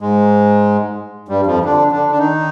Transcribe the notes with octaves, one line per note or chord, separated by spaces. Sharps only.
G#2 G#3
G2 G3
F2 F3
D3 D4
D3 D4
D4
D#3 D#4